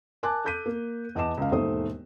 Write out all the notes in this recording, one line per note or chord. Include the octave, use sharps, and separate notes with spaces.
A#4 G#5 A5 D6 F#6
A4 D6 G6 B6 D#7
A#3
E2 D#5 A5 D6 E7
C#2 F5
E1 D#2 G#2 A3 C5 D#6